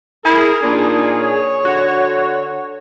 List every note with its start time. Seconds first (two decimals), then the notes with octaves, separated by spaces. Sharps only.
0.25 E4 G#4 A#4
0.63 A#2 D4 D#4
1.18 C#5
1.65 D3 F#4